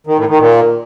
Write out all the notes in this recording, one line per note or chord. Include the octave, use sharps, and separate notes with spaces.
D#3
A2
D#3
A#2